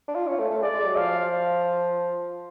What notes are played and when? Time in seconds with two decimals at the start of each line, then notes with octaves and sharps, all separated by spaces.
0.08 D4
0.16 F4
0.27 C#4
0.39 A3
0.50 A3
0.62 G#3 D5
0.74 G#3
0.86 F#3
0.97 F3 F5